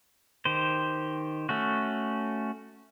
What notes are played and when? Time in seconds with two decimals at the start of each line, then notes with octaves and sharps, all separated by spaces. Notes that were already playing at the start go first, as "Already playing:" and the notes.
0.45 D#3 G4 C5
1.49 A3 C#4 F#4